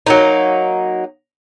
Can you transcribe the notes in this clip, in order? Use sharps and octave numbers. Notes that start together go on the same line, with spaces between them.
F#3 A#3 D#4